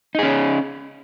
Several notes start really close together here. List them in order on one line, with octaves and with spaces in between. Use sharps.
D#4 G#4 C#4